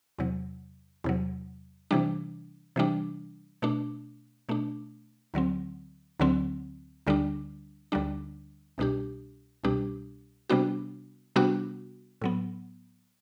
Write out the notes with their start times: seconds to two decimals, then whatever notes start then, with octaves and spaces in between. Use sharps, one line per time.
0.19 E2 C3 F#3
1.04 E2 C3 F#3
1.91 C3 E3 G3 D4
2.76 C3 E3 G3 D4
3.62 B2 A3 D4
4.49 B2 A3 D4
5.34 D2 D3 F#3 C4
6.20 D2 D3 F#3 C4
7.07 D2 D3 G3 D4
7.92 D2 D3 G3 D4
8.78 C2 B2 G3 D4 G4
9.64 C2 B2 G3 D4 G4
10.50 C3 G3 B3 D4 F#4
11.36 C3 G3 B3 D4 F#4
12.21 A2 F#3 B3